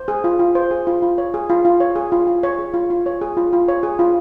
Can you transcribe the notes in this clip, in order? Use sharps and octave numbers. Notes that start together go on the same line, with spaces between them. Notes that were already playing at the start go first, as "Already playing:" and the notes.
Already playing: C5
G#4
F4
F4
C5
G#4
F4
F4
C#5
G#4
F4
F4
C#5
G#4
F4
F4
C#5
G#4
F4
F4
C#5
G#4
F4
F4
C#5
G#4
F4